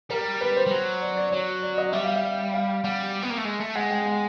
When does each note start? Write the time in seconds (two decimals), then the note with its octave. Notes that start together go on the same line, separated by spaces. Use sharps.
0.10 G3 A#4
0.41 B4
0.56 C5
0.67 G3
0.71 F#3
1.02 D5
1.17 D5
1.32 F#3 C#5
1.62 D5
1.78 D#5
1.93 G3 E5
2.05 F5
2.16 E5
2.54 F5
2.84 G3 F#5
3.22 B3
3.30 A#3
3.38 A3
3.45 G#3
3.60 A3
3.75 G#3 F#5
3.91 G5
4.06 F#5